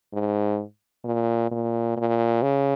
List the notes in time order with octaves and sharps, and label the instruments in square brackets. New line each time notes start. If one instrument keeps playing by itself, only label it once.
[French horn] G#2
A#2
A#2
A#2
C#3